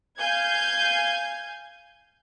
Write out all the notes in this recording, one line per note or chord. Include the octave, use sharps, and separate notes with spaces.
F5 G#5 G6 G#6